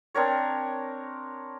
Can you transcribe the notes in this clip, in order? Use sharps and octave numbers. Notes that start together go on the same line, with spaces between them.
C4 D4 A#4 C#5